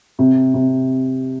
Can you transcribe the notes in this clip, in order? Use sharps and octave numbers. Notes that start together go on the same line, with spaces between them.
C3
C3